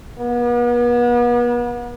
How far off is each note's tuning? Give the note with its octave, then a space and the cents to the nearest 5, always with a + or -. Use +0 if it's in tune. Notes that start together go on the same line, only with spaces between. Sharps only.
B3 -40